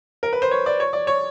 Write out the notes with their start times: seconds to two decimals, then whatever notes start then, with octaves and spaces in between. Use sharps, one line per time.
0.23 A#4
0.33 B4
0.42 C5
0.51 C#5
0.66 D5
0.80 C#5
0.93 D5
1.07 C#5